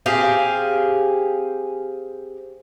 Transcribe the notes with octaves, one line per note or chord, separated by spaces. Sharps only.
C4 G4 G#4 F5